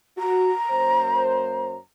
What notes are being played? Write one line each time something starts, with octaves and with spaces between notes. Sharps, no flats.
F#4 A#5
F#2 A#3 C5